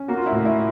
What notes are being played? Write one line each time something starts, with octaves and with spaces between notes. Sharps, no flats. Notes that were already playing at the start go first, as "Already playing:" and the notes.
Already playing: C#4
A#3 F#4
F4
E4
A2
E4